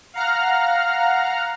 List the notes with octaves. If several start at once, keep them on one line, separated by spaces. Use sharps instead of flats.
F5 F#5 A#5 F6